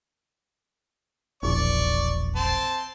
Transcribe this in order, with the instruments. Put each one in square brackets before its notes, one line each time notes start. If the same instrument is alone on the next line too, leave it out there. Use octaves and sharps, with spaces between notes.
[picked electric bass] E1 A#1 [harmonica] D5 C#6
[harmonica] C4 A5 C6